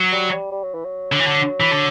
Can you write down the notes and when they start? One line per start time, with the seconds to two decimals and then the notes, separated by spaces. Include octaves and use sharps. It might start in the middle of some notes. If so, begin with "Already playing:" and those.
Already playing: F#3
0.12 G3
0.32 G3
0.52 G3
0.63 F#3
0.74 E3
0.85 F#3
1.12 D3
1.19 E3
1.27 D3
1.60 E3
1.71 D3